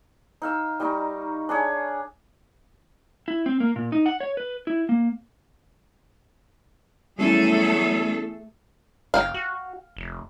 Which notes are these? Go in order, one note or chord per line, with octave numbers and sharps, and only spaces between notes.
D#4 F5 E6
G3 D#4 A#5 C#6
D4 G#4 C#5
E4
C4
A#3
A#2
D#4
F#5
C#5
B4
E4
A#3
E2 F#3 G3 A3 C#4 E4 G#4 A4
F#1 F5 G5
F#4
F1